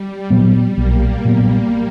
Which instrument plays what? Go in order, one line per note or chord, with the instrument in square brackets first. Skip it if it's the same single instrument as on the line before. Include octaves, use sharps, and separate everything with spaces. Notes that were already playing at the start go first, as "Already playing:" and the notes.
Already playing: [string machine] G3
[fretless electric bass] A#2 F#3 B3
[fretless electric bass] B1 [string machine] A#3
[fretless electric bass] A#2 F#3 B3